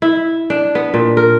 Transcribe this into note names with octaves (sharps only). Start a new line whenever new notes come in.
E4
D4
B3
A#2
A#4